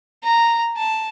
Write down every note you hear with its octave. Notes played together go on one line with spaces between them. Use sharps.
A#5
A5